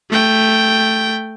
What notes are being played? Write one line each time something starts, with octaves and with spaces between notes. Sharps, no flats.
A3 G5